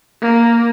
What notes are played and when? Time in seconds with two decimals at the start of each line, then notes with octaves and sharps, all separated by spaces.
0.22 A#3